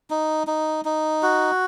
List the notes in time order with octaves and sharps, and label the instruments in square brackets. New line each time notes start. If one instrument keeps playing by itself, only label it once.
[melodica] D#4
D#4
D#4
F#4